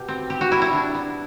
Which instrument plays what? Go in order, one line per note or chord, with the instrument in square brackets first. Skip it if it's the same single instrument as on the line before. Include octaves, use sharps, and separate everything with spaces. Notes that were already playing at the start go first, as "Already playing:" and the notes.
Already playing: [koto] B2 G4
C4
C4 G4
F#4
G3 E4
E4
D4
B3